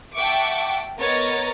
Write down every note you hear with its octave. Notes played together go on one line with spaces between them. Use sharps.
E5 F#5 G5 A5 C#6 D6
B3 A#4 C#5 D#5 A#5 A6